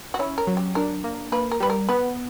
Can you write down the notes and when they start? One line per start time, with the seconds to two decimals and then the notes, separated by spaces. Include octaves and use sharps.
0.14 F#4
0.19 C#4 E4
0.38 A#4
0.47 F#3
0.57 G4
0.75 D4 A#4
1.04 A#3
1.32 A#3 B4
1.51 A#4
1.60 G3 B4
1.70 A#4
1.89 B3 B4